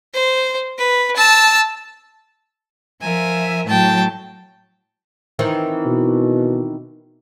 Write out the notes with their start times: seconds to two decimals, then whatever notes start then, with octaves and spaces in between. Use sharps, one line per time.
0.14 C5
0.78 B4
1.16 A5 E6
3.01 F3 A#4 E5 G#5
3.68 A2 F#3 G5 A5
5.39 D#3 E3 C4
5.85 B2